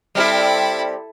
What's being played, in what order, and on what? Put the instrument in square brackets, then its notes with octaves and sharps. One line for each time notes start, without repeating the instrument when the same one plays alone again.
[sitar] G3 C4 G4 [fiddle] E4 A4